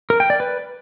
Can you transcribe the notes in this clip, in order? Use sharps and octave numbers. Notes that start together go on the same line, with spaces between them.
A#4
G5
D5
B4